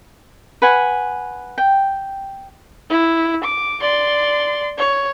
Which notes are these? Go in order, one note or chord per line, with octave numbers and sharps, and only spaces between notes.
B4 F#5 G#5
G5
E4
D6
D5 C6
C#5